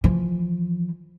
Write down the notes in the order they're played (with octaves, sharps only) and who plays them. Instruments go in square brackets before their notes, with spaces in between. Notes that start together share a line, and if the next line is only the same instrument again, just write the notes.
[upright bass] E3 F3